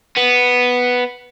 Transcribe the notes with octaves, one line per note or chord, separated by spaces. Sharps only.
B3